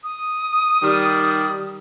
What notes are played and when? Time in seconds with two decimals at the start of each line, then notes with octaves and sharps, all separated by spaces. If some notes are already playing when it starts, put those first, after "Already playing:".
0.04 D#6
0.83 D#3 G3